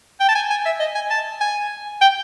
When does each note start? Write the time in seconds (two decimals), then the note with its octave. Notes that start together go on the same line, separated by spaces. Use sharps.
0.20 G5
0.29 A5
0.35 G#5
0.50 G#5
0.66 E5
0.80 D#5
0.95 G#5
1.11 A5
1.41 G#5
2.01 G5